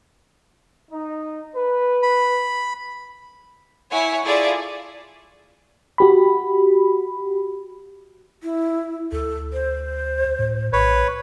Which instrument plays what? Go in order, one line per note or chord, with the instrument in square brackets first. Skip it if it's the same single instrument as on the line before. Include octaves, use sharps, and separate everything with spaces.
[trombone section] D#4
B4
[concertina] B5
[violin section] E4 C#5 F#5 G#5
E4 F4 G#4 A4 D5
[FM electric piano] F#4 G4 B5
[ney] E4
[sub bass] D2 [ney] A4
[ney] C5
[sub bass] A2
[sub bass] A#1 [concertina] B4 C#5